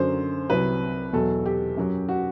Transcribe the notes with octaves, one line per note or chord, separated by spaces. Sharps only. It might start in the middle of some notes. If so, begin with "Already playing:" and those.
Already playing: F#2 D3 F#3 C5
C2 C3 F#3 B4
E2 B2 F#3 A4
G4
F#2 F#3
F#4